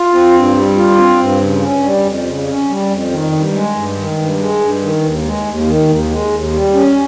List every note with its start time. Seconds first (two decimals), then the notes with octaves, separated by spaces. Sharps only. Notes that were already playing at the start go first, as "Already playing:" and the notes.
Already playing: F4
0.13 C4
0.34 G2
0.55 G3
0.77 F4
0.98 C4
1.19 G2
1.41 C#3
1.62 C#4
1.83 G3
2.05 F2
2.26 C#3
2.47 C#4
2.69 G3
2.90 F2
3.11 D#3
3.32 G2
3.54 G#3
3.75 G2
3.97 D#3
4.18 G2
4.39 G#3
4.60 G2
4.82 D#3
5.03 D#2
5.25 G#3
5.46 D#2
5.67 D#3
5.89 D#2
6.11 G#3
6.32 D#2
6.53 G3
6.74 C#4